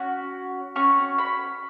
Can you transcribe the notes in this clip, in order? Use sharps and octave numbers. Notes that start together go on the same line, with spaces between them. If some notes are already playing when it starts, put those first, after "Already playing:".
Already playing: C#4 F#4
C#4 F#4 C#6
B5